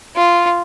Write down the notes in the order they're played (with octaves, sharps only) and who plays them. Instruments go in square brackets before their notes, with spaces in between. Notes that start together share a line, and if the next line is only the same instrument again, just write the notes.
[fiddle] F4